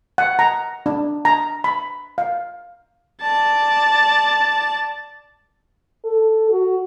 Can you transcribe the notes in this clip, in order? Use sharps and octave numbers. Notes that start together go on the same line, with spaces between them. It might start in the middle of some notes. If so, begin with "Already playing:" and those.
F#5
A#5
D4
A#5
B5
F5
D5 A5
A4
F#4